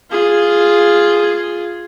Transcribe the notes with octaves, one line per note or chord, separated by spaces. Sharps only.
F4 G#4